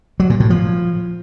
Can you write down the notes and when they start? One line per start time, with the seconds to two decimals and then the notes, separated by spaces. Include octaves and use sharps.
0.20 F#3
0.30 A#2
0.40 A2
0.50 F3